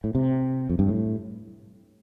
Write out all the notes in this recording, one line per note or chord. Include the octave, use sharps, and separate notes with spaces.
A2
C3
F2
G2
A2